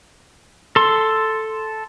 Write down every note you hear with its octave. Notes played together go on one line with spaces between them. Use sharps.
A4 C6